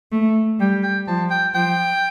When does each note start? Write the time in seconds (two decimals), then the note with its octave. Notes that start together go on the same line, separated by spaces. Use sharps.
0.12 A3
0.60 G3 G5
0.83 G5
1.07 F3 A5
1.30 G5
1.54 F3 G5